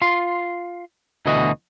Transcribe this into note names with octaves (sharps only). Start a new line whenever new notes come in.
F4 C6
D2 B2 D3 E3 F#4 D#5